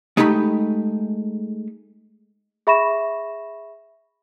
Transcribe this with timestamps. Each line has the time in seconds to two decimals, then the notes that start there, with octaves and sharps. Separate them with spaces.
0.17 G#3 A3 D#4 G4 B5
2.67 G#4 E5 B5 C#6 A#6 E7